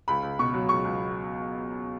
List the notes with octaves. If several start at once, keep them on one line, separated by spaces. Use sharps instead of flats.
C#2 B5
C#2
B2 C#6
F#3
C#2 C#6
C#2